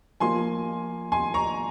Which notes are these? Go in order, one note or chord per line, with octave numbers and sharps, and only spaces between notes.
F3 A#3 F4 G#5 C6
G#5 C6
A#5 C#6